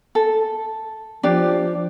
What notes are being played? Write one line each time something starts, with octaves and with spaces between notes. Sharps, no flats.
A4
F3 D4 G4 D5